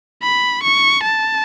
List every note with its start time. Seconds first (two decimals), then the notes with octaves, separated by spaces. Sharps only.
0.23 B5
0.63 C#6
1.03 A5